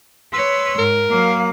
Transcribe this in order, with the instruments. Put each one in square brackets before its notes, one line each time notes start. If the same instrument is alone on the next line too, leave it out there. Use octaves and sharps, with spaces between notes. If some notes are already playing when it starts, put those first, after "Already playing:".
[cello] B4 C#5 [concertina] C6 E6
[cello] G#2 [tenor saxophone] A#4
[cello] F#3 F5 [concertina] A#3